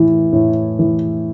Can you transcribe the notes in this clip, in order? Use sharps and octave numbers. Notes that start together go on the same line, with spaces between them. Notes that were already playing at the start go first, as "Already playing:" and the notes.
Already playing: A2 E3
A2
E3